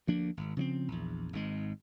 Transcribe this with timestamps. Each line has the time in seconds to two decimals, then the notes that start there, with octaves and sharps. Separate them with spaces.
0.07 D2 F3 A#3 D4
0.37 G#1
0.57 C#3 F3 A3 C4
0.88 A#1 E2
1.33 G#1 G#2 G#3